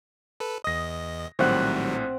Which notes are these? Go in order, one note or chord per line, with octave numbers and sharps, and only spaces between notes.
A4 B4
E2 D#5 D#6 A#6
A#1 A2 D#3 F#3 G3 C4 F#5